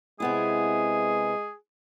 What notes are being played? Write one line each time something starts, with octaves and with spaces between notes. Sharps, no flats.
C3 G#3 B3 E4 G#4